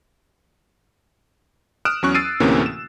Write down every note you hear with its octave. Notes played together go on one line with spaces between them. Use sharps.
D#6 F6 F#6 D7 E7
E2 F#3 C#4 C#6 F#6
E6 A6 C7 D7 D#7
D2 A2 C3 E3 A#3 C#4
E7